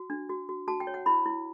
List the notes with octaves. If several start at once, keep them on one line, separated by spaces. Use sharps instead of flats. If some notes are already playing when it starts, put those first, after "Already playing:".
Already playing: F#4
D4
F#4
F#4
F#4 A5
G5
C#5
F#5
E4 B5
E4